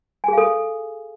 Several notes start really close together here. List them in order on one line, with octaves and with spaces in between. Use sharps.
G#5 G#4 F5 A4